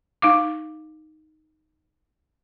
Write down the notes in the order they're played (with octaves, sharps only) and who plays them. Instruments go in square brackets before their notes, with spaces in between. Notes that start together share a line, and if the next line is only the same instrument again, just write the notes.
[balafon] D#4 F5 D6